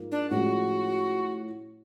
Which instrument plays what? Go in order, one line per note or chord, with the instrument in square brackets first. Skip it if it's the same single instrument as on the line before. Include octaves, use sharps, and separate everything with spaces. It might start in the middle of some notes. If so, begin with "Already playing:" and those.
Already playing: [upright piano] G#2 F3 A#3
[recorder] D4
[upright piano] A2 F3 G#3 C#4 [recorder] F#4